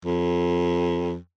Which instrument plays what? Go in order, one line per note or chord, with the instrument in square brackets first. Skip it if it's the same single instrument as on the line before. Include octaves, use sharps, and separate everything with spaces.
[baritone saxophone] F2